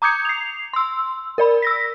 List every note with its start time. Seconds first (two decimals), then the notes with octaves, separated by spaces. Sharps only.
0.02 A#5 D6 D#6 G6 G#6 C#7
0.25 C7 F7
0.73 C6 E6
1.38 A#4 D5 B5
1.62 E6 A#6 B6